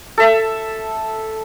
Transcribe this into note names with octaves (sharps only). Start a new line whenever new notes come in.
A4 E5